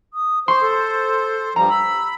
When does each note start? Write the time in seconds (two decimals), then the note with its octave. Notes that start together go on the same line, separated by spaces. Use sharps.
0.14 D#6
0.48 C5 C6 C#6
0.61 A4
1.56 G2 F3 G3 A#5
1.70 B5 E6